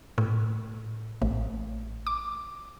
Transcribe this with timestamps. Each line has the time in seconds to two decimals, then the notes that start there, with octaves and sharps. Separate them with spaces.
0.18 A2
1.22 A1
2.07 D6